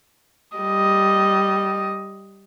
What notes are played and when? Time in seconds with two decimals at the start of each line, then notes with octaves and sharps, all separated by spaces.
0.57 G3 D#5